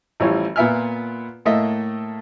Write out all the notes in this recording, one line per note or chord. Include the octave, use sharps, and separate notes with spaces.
A1 E3 F3 G3 C#5
A#2 B3 F4 E5 G#5 F6
A2 A3 A#3 D#5 E5